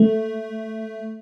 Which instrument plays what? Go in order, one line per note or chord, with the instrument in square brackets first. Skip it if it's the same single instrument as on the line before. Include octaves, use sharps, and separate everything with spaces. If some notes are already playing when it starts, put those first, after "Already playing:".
Already playing: [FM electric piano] A3